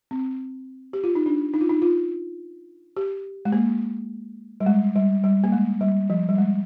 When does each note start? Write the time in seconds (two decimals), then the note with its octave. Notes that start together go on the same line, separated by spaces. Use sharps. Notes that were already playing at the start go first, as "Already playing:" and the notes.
0.11 C4
0.93 G4
1.04 F4
1.15 D#4
1.26 D4
1.54 D#4
1.61 F4
1.69 D#4
1.82 F4
2.97 G4
3.45 G#3
3.52 A#3
4.60 G3
4.66 G#3
4.96 G3
5.24 G3
5.44 A#3
5.52 G#3
5.81 G3
6.10 F3
6.29 G3
6.38 G#3